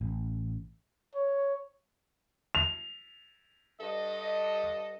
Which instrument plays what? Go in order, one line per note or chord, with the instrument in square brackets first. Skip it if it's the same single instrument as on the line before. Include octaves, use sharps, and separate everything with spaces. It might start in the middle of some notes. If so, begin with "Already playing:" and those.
[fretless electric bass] A1
[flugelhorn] C#5
[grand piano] F7
[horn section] G2 A4 D#5